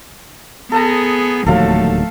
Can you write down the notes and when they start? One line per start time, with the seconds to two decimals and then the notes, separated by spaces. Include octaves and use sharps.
0.72 B3 G#4 A4 A5 A#5
1.46 D1 D#2 F3 F#3 A3 A4 F5